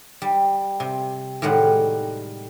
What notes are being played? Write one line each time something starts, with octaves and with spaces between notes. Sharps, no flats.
G3
C3
A2 D#3 G3 G#3 F#5